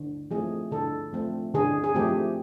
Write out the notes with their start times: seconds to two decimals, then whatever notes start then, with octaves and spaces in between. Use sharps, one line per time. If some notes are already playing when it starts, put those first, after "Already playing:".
Already playing: D3
0.31 F3 A3 C4 G#4
0.71 D3 A4
1.13 F3 A3 C4
1.54 D3 G#4
1.84 G#4
1.95 F3 A3 C4 G4